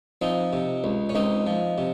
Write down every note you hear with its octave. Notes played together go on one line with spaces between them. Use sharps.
F3 C4 D#4
C3
C#2
C#4
C#2 C4 D#4
F3
C3